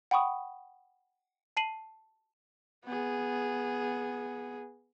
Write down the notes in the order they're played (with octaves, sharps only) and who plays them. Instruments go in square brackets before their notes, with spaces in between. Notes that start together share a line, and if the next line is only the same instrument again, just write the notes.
[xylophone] F#5 G5 B5 C#6 D#6
A5 C7 D#7 F#7
[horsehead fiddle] B3 G#4